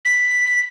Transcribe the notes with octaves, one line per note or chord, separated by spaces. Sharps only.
B6